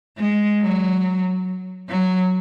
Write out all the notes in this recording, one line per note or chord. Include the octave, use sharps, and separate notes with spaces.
G#3
F#3
F#3